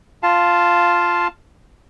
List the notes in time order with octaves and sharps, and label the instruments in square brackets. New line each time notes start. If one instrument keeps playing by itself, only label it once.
[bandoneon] F4 F5 A5